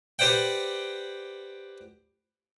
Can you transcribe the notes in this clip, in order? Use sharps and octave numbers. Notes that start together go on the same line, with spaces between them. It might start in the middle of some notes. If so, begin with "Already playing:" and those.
G4 B4 C5 D5 F#5 G5